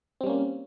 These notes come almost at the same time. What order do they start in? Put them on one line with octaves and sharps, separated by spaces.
C4 G3 C#4 A#3